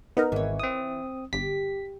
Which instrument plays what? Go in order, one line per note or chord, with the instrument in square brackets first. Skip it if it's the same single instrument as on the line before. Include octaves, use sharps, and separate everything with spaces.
[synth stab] B3 D#4 A#4
[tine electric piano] G#1 [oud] E3 C#5
[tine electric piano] C4 D#6
[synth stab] G1 [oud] G4 [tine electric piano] B6